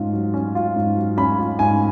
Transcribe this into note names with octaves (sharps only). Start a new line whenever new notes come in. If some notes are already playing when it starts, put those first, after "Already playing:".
Already playing: G#2 C#4 F4
F#3
C#4
F4
G#2
F#3
C#4 B5
F4
G#2 G#5